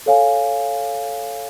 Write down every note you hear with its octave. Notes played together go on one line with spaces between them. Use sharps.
A4 C#5 F5 G#5